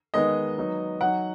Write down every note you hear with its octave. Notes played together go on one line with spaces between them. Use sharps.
D#3 G#3 B3 D#4 D#5
F#3 B3 D#4
F#3 D#4 F#5